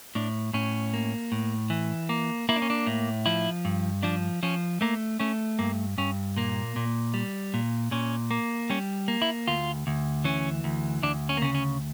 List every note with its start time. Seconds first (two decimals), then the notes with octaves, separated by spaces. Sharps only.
0.15 A2 D4
0.53 A2 C#4
0.94 A#3
1.32 A2
1.70 E3
2.09 A#3
2.49 A#3 E4
2.56 D4
2.62 C#4
2.70 D4
2.87 A2
3.26 F3 E4
3.65 G2
4.03 F3 D4
4.43 F3 C#4
4.81 A3 A#3
5.20 A3 C#4
5.59 G2 A#3
5.98 G2 C#4
6.37 A#2 A#3
6.76 A#2
7.14 G3
7.54 A#2
7.91 A#2 C#4
8.31 A#3
8.70 G3 C#4
9.08 A#3
9.22 E4
9.48 D2 F4
9.87 D2
10.24 E3 C#4
10.64 D2
11.03 D2 D4
11.29 C#4
11.37 A#3
11.42 C#3 C#4
11.55 C#4